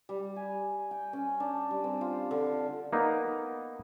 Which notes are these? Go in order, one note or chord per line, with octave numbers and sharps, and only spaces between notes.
G3
G#5
G5
C#4
D4
G3
C4
F4
D3
A#3 B3 D#4